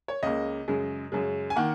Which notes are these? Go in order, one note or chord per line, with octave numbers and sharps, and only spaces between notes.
C#5
C#2 C#3 A#3 D#5
F#2 C#3 G#3
F#2 C#3 G#3
G#5
D#3 A#3 F#5